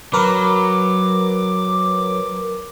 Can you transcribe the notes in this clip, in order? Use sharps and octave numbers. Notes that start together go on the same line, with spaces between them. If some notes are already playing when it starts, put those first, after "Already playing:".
F#3 A#4 B4 D6